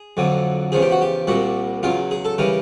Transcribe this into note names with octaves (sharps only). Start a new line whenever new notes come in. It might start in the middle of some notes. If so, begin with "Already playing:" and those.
Already playing: G#4
F2 D3 F#3
E2 C#3 F3 G#4
G4
F#4
G4
C2 A#2 G3 F#4
E2 C#3 F#3 F4
G#4
A4
C#3 E3 G3 A#4